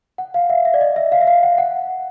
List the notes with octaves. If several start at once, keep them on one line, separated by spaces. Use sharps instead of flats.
F#5
F5
E5
E5
D5
D#5
E5
F5
E5
F5
F#5
F#5